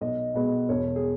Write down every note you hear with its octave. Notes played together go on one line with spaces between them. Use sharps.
B1 D#5
B2 G#3 B3
E1 C#5
G#4